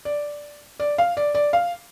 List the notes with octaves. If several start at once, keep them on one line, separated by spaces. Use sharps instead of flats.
D5
D5
F5
D5
D5
F5